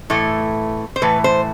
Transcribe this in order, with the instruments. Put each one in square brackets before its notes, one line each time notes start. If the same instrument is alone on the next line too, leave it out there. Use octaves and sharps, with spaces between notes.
[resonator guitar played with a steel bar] A2 E3 A3
C5
A2 E3 A3 B4
C5